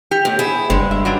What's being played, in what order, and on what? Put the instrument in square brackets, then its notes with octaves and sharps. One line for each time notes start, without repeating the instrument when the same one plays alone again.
[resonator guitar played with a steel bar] G4
[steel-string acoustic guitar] A2
[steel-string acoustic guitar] E4 [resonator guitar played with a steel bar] G#4
[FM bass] F#1 [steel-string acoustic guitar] G2 G#3
[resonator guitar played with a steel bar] E5
F#3 G3 D4